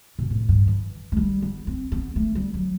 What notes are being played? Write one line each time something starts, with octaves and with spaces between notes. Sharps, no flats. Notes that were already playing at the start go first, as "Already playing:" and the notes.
B2
A2
G2
E3
A3
G3
B3
C4
B3
A3
G3
F#3